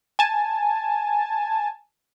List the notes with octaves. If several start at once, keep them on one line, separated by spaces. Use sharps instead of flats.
G#5 A5